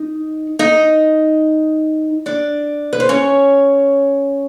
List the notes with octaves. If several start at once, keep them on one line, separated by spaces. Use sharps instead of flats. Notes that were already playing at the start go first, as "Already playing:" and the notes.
Already playing: D#4 D#5
D#4 D#5
D4 D5
B4
C5
C#4 C#5